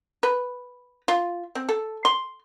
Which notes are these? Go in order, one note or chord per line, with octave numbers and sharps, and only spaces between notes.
B4
F4
C4
A4
C6